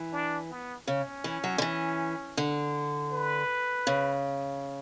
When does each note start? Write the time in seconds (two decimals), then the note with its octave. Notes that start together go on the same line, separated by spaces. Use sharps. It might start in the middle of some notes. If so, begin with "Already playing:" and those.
Already playing: E3
0.13 D4
0.50 B3
0.87 C#3 C#4
1.24 E3
1.44 F#3
1.58 D3
1.62 E3
2.37 D3
3.13 B4
3.87 C#3